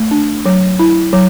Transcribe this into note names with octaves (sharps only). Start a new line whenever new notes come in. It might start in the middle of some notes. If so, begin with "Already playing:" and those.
Already playing: A3
D4
F#3
E4
F#3